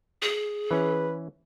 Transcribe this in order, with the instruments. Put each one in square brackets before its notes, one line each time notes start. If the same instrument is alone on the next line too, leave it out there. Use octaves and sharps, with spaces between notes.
[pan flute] G#4
[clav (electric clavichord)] E3 C#4 [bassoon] B4